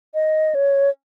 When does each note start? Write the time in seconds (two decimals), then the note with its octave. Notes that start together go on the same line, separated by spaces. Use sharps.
0.14 D#5
0.55 C#5